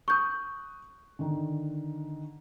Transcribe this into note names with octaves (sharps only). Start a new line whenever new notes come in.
C#6 D#6 F#6 G6
D3 D#3